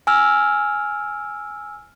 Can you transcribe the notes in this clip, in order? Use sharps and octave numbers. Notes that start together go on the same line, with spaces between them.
G#5 E6 F6